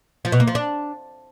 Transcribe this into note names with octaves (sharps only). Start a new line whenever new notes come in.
F3
B2
A#3
F3
D4